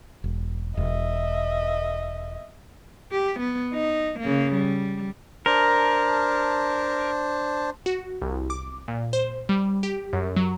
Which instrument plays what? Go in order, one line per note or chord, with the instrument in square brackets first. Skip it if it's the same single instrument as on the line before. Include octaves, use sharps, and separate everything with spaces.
[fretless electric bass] E1
[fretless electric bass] E1 [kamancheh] D#5 E5
[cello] G4
B3
D#4
C#3 A#3
G3
[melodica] D4 C5 A5 [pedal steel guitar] A#4
[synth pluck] F#4
C2
D6
A#2
C5
G3
G4
F#2
F#3